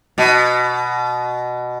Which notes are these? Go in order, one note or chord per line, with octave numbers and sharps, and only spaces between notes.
B2